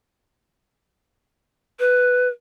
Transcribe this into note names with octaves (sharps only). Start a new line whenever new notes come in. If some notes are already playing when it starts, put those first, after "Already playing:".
B4